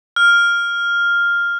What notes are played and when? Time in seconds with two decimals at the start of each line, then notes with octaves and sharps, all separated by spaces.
0.16 F6